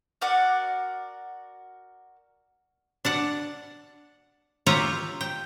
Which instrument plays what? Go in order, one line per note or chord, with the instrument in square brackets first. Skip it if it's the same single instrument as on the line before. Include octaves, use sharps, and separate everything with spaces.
[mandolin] F#4 A#4 D5 F#5
[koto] D4 D5 F#5
F4 G4 C#5 E5 A#5
G5